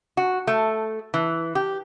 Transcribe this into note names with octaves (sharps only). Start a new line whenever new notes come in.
F#4
A3
E3
G4